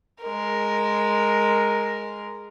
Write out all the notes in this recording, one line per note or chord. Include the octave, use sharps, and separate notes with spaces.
G#3 A#4